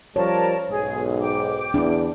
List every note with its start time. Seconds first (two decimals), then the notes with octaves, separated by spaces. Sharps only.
0.16 F3 G3 A#4 C#5 A5
0.70 B1 G#2 G#4
1.20 G5 D6
1.74 E2 D4